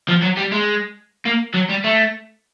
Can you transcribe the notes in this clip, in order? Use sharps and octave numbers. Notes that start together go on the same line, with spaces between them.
F3
F#3
G3
G#3
A#3
F#3
G3
A3